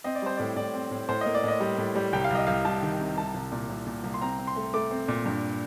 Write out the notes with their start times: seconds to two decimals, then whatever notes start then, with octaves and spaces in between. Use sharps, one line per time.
0.04 C4 D#5
0.15 D5
0.22 G3 C5
0.37 A2 D5
0.56 A2 D5
0.74 C4
0.91 A2
1.09 A2 C5
1.21 D#5
1.26 A#3
1.34 D5
1.43 A2 D#5
1.60 G3
1.78 A2
1.95 G3
2.13 C2 G5
2.24 F5
2.31 C2 D#5
2.47 C2 F5
2.65 C2 A5
2.82 D#3
3.00 C3
3.17 C2 A5
3.34 C2
3.52 A#2
3.69 C2
3.87 A#2
4.04 C2
4.14 C6
4.21 C4 A#5
4.39 C4
4.47 C6
4.56 A3
4.74 A3 D6
4.91 C4
5.08 A#2
5.26 G2